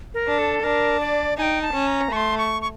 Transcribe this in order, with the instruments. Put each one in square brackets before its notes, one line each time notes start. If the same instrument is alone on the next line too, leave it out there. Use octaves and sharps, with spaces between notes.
[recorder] A#4
[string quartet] D4
[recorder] A4
[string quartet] D4 [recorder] A#4
[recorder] D5
[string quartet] D#4 [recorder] G#5
[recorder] G5
A5
[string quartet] C#4
[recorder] A#5
[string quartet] A3 [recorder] C#6
[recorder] C6
C#6
C#6